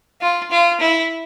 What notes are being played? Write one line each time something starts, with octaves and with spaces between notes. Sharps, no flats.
F4
F4
E4